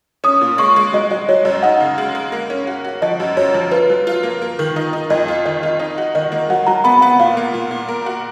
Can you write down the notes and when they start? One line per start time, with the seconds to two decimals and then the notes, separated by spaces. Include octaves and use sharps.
0.24 C#4 D#6
0.41 A#2
0.58 G#3 C#6
0.76 G#3
0.93 F#3 D#5
1.10 F#3 D#5
1.29 F#3 C#5
1.45 F#2 D#5
1.63 D#4 F#5
1.80 C#3
1.98 G#3
2.15 G#3
2.32 A#3
2.50 C#4
2.67 F#4
2.85 F#4
3.02 F3 D#5
3.20 F#2
3.37 F#2 C#5
3.54 F3
3.71 F4 B4
3.90 F#3
4.07 F4
4.23 A#3
4.42 A#3
4.59 D#3
4.76 D#4
4.93 D#4
5.10 F2 D#5
5.28 F4
5.46 D#3 D#5
5.63 F4
5.79 D#4 D#5
5.98 F#4
6.15 D#3 D#5
6.32 A#3
6.50 F#3 F#5
6.67 F#3 A#5
6.84 B3 B5
7.01 B3 F#5
7.19 A#2 F5
7.37 A#3
7.54 A#2
7.71 A#2
7.89 A#4
8.06 F#4